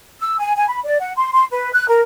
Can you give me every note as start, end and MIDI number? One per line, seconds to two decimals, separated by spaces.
0.20 0.37 88
0.39 0.53 80
0.56 0.68 80
0.69 0.79 83
0.85 0.98 74
1.00 1.14 78
1.16 1.31 84
1.32 1.45 84
1.50 1.71 71
1.74 1.87 90
1.88 2.01 70